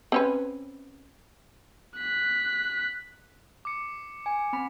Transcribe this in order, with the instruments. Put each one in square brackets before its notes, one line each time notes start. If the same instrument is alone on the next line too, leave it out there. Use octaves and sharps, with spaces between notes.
[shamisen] C4 C#4 B4
[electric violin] F#6 B6
[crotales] D6 C#7
[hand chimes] G#5
C4 B5